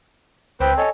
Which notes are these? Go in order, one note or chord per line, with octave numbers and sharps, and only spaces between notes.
C#2 C4 B4 C5 G5
A4 C#5 D#5 G#5